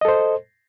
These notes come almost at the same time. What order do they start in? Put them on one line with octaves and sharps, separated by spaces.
D#5 A4 C5